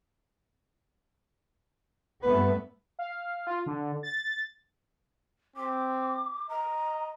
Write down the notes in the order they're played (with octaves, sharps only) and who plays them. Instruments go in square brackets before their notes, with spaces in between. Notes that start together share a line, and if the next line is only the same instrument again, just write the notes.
[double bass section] G2 A3 B3 [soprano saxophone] B4
[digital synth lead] F5
F4
D3
A6
[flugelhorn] C4 [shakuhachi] D6
[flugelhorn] D#5 [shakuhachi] A#5